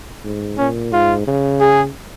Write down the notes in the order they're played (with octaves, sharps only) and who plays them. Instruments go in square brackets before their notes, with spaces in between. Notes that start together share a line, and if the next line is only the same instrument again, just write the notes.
[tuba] G#2
[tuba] A#2 [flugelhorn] C#4
[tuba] G#2 [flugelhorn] F4
[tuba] C#3
[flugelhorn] G#4